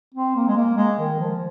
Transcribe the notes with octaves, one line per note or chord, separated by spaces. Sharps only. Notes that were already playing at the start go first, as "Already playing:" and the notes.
C4
A#3
G#3
A#3
G#3
D#3
F3